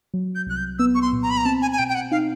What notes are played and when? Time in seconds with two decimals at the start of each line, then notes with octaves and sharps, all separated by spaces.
0.14 F#3
0.35 G6
0.47 C2 F#6
0.57 G6
0.79 B3 E6
0.95 C#6
1.02 C6
1.13 A#2
1.23 A#5
1.30 B5
1.37 A#5
1.45 C4 A5
1.62 G#5
1.72 G#5
1.78 B2 G5
1.89 G5
1.95 F#5
2.11 D#4 F5